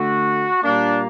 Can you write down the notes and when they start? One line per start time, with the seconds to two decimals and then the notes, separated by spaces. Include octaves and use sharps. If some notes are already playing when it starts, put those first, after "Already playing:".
Already playing: D3 A3 F#4
0.62 A#2 G3 A#3 D4